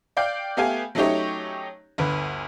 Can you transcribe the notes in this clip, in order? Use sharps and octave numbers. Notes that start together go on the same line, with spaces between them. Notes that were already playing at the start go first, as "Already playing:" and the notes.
D5 F5 G5 G6
A3 B3 G4 F5 G#5
F#3 A3 C#4 D#4 G4 C#5
G1 D2 B4